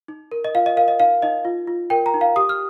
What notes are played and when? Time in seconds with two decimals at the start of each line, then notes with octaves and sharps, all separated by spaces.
0.08 D#4
0.32 A#4
0.44 D#5
0.55 F4 F5
0.66 D#5
0.77 A#4 F5
0.88 D#5
1.00 D#4 F5
1.22 D#4 D#5
1.45 F4
1.67 F4
1.90 A#4 G5
2.06 A#5
2.14 D#4
2.21 F5
2.36 G4 D#6
2.49 F6